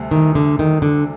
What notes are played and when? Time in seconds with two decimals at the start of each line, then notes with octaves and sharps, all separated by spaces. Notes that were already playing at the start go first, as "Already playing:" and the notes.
Already playing: D2 C3 G3
0.11 D#3
0.35 D3
0.59 D#3
0.82 D3